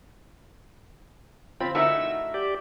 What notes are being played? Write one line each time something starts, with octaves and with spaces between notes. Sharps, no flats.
C4 F4 B5
A3 D#4 E4 F#4 A#4 E5 E6
G4 D5